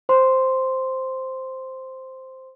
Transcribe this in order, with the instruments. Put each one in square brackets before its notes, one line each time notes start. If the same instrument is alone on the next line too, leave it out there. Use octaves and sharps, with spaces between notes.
[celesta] C5 C6